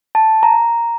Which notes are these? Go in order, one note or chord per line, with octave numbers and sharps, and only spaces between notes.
A5
A#5